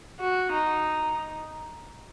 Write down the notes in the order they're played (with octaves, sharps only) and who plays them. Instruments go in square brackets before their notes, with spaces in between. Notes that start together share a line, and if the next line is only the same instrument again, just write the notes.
[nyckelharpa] F#4
D#4